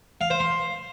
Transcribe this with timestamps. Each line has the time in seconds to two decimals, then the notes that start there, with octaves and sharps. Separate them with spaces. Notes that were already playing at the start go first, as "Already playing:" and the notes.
0.21 F5
0.30 C5
0.40 C6